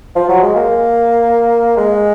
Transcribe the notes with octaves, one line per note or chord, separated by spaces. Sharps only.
F3
F#3
G#3
A#3
G#3